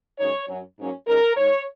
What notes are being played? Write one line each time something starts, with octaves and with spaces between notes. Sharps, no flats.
F#2 C#3 G#3 D#4 C#5
F#2 F#3 C#4
G#2 F#3 A#3 C#4
D#3 G#3 C#4 A#4
G#2 G#3 D#4 C#5